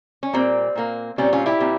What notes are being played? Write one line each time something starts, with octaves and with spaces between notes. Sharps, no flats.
C#4
A#2 G3 A#3 C4
A#2 G3 A#3
A#2 G3 C4 C#4
C#4 F4
E4 G4
A#2 G3 C4